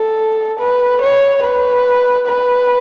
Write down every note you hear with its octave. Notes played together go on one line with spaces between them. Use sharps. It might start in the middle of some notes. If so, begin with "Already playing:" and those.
Already playing: A4
B4
C#5
B4
B4